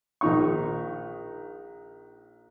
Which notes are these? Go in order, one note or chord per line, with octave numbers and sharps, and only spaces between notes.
A#1 D#3 F3 D#4 F5 C#6